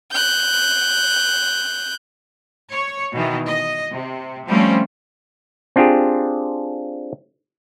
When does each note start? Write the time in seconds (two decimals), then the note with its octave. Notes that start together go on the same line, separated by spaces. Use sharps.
0.12 F#6 G6
2.71 C#5
3.12 B2 D#3 E3
3.47 D#5
3.92 C3
4.47 F3 G3 A3 C4 C#4
5.76 C4 D4 F4 G4 G#4